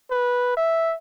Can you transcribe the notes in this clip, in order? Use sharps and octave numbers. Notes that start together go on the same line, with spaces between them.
B4
E5